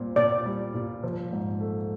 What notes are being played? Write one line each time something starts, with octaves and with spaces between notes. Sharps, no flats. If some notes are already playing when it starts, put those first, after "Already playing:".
Already playing: A#2 G3 C4
A#2 D5
G3
A#2
F3
G#2
A3